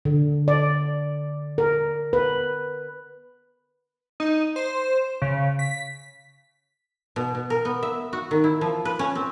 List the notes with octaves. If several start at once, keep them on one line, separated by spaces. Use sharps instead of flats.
D3
D5
A#4
B4
D#4
C5
C#3
B6
B2
B2
A#4
B3
E5
F#4
D#3
E4
F3
B4
C#4
C4